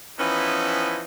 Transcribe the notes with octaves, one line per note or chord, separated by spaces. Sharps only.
E3 F3 B3 C#4 D#4 E4